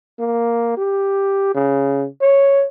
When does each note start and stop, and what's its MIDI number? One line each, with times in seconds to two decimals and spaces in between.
0.19 0.77 58
0.77 1.51 67
1.54 2.07 49
2.21 2.65 73